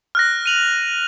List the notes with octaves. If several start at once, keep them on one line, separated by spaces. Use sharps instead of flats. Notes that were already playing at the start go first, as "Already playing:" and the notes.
F6 F#6 A#6
D#7 F7 F#7